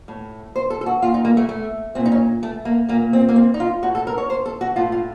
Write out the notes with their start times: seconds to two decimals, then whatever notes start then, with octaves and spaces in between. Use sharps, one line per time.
0.08 A2
0.56 C5
0.70 A4
0.81 A4
0.86 F#4
1.02 A#2 F4
1.14 D#4
1.25 A#3
1.37 A3
1.49 A3
1.95 A#2 C4
2.06 D#4
2.12 C#4
2.43 A3
2.65 A#3
2.89 A#2 A#3
3.13 C4
3.29 A#3
3.36 C4
3.54 D#4
3.60 F4
3.83 A2 F#4
3.95 A4
4.07 A#4
4.18 C#5
4.30 C5
4.46 A4
4.61 F#4
4.76 A2 F4
4.92 F4